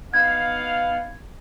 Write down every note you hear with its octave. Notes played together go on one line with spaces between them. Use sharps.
B3 D#4 F5 G#6